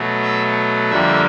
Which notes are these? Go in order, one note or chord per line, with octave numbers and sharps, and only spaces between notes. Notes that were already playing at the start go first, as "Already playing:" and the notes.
Already playing: B2 F#3 A3
E5
F2 D3 G3 A#3 E5